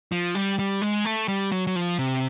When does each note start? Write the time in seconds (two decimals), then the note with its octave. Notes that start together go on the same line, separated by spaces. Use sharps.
0.12 F3
0.35 G3
0.59 G3
0.82 G#3
1.05 A3
1.28 G3
1.52 F#3
1.67 F#3
1.76 F3
1.99 C3